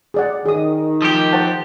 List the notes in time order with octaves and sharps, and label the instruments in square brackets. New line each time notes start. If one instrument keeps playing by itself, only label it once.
[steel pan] G#4 D5 F#5
[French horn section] D#3 [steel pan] G#4 D#6
[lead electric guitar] F3 G4
[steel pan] C5 F#5 A5